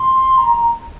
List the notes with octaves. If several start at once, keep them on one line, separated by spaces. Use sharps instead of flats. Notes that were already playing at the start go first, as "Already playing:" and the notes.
Already playing: C6
A#5